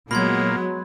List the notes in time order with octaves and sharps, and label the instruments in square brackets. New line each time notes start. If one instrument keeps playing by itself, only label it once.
[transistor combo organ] A#2 A#3 [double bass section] F#3 [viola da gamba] G#3 B3 [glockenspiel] B5 C6 G#6